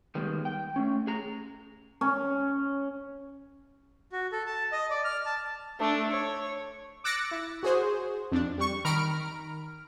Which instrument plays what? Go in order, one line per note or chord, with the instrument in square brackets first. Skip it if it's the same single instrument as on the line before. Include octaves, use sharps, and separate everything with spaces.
[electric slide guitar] D#3 G3 G#3 A#3 B3
G5
A3 C#4
G#4 A#5
[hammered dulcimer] C#4
[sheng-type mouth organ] F#4
A4
A5
D#5
D5
F6
A5
[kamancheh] A3 D4
C#5
[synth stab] D6 E6 F#6 A6 A#6 C#7
E4
F#4 G#4 C5
F2 D4
G3 C#6
D#3 A#5 B5 F6 D7